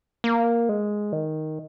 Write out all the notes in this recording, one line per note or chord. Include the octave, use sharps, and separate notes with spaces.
A#3
G#3
D#3